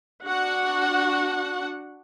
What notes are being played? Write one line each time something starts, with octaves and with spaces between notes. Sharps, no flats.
D4 F#4 F#5